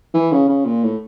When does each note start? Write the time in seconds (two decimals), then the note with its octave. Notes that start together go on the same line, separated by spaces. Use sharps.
0.14 E3
0.32 C#3
0.49 C#3
0.65 A#2
0.83 A2